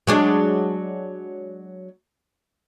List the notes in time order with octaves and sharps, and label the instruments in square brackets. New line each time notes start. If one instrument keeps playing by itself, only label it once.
[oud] F#3 G#3 D4